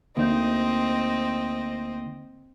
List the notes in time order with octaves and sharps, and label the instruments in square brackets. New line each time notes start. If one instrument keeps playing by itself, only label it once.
[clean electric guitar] D2 D#4 [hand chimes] A#3 [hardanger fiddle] C4 D#5